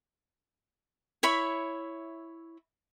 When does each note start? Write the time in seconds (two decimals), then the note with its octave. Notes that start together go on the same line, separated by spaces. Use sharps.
1.23 E4 C#5 E5 B5